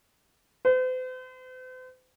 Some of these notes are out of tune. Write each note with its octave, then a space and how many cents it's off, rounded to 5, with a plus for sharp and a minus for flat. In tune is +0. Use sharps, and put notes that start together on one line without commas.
C5 -45